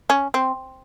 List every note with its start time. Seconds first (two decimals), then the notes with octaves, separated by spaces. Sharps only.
0.10 C#4
0.34 C4